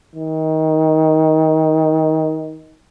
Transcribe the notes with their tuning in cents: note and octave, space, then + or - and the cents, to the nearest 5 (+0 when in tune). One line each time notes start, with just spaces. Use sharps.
D#3 +20